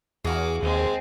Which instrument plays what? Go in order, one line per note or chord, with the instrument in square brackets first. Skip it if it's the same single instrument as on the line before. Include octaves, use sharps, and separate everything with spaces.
[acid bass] E2 [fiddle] F#4 D6 [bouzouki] G#4 F5
[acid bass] D#2 [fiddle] G#3 C4